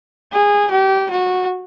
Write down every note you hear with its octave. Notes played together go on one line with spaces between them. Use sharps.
G#4
G4
F#4